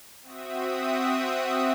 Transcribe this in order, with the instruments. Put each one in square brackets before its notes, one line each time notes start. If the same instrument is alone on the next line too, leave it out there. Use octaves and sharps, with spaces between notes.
[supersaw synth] C4 F#4 E5 D#6